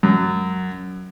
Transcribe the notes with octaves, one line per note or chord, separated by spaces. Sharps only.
F#2